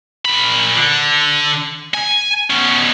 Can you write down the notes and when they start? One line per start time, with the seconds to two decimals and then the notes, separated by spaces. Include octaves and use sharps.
0.25 A#2 B5
0.75 D3
1.95 G#5
2.50 B2 C#4